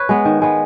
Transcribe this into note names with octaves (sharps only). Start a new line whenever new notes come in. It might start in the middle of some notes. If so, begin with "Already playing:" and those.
Already playing: B4 C#5
G#3 B3
D#3
G#3 B3